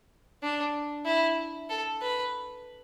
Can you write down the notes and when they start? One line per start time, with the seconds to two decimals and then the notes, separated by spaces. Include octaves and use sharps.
0.43 D4
1.06 E4
1.70 A4
2.02 B4